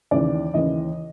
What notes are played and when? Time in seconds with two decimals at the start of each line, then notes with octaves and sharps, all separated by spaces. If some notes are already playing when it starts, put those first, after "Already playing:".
0.11 D#2 C#3 E3 D5
0.54 D#2 C#3 E3 D#5